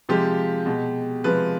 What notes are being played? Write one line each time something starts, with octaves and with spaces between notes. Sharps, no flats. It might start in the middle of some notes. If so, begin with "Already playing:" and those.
C3 F3 G#3 G4
B2 G#3
C3 F3 G#3 B4